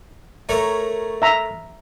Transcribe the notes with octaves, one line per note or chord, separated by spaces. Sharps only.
A3 A#4 C#5
E5 A#5